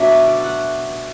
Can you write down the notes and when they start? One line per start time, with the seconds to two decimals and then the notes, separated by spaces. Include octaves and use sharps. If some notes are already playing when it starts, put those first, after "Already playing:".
Already playing: B2 F#3 A3 D4 E5
0.09 D5
0.27 D5
0.44 F#5